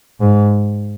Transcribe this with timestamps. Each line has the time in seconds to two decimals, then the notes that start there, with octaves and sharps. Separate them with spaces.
0.20 G#2